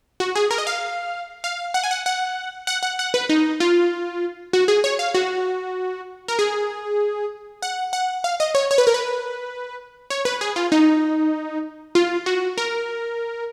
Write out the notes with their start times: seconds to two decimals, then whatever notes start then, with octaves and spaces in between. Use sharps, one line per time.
0.20 F#4
0.35 G#4
0.51 A#4
0.58 D#5
0.67 F5
1.44 F5
1.74 F#5
1.84 G#5
1.91 F#5
2.06 F#5
2.67 F#5
2.83 F#5
2.99 F#5
3.14 B4
3.29 D#4
3.60 F4
4.53 F#4
4.68 G#4
4.84 C#5
4.99 F5
5.15 F#4
6.28 A#4
6.39 G#4
7.62 F#5
7.93 F#5
8.24 F5
8.40 D#5
8.55 C#5
8.71 C#5
8.78 B4
8.87 A#4
8.94 B4
10.10 C#5
10.25 B4
10.41 G#4
10.56 F4
10.72 D#4
11.95 F4
12.26 F#4
12.58 A#4